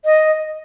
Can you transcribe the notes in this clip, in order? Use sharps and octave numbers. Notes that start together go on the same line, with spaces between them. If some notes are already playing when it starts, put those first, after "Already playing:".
D#5